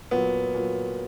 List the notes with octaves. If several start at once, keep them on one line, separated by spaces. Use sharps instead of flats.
A#2 F#3 B3
A#2 F#3